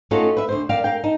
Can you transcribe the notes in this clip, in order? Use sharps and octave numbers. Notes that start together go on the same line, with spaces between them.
A3 C#4 D#4 F4 F#4 A4
B4 E5
D2 G#2 C5
A#4 D5 E5 F5 G5
A#4 F5 G5
D#4 D#5 A5